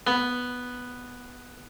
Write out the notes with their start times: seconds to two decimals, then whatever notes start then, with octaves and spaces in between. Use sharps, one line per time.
0.07 B3